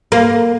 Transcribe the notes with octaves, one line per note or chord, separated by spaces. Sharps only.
A#3